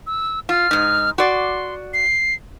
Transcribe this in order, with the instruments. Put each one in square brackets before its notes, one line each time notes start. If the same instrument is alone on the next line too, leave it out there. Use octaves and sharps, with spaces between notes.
[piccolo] E6
[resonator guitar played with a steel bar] F4 [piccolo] F6
[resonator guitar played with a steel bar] G#2 D#4
[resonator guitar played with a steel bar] F#4 D5 [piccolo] C6
[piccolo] C7